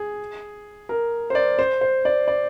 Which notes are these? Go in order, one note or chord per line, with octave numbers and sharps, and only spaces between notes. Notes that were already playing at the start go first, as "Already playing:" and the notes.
Already playing: G#4
A#4
C5
D5
C5
C5
D5
D5